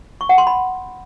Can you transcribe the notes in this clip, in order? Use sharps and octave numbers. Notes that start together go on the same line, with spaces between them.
C#6
F#5
C6
B5